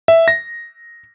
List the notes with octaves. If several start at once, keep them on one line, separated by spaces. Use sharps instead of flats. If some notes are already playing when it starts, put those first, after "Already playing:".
E5
A#6